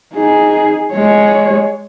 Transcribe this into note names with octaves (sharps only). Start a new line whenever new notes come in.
D#4 G#4
G#3 C#5